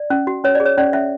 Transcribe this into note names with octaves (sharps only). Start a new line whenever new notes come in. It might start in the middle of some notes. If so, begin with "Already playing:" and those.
Already playing: D5
C#4
F#4
C#4 C#5
D5
G#4
C#5
C#4 D5
C#4 E5